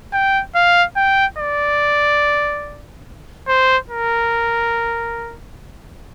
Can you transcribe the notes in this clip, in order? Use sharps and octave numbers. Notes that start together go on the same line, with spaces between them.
G5
F5
G5
D5
C5
A#4